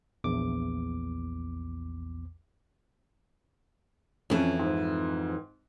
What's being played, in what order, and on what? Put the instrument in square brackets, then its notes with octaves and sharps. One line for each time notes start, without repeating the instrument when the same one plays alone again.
[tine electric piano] A#1 E2 D6
[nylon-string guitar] F2 E3 [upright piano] F3 C#4
[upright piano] G#2 C4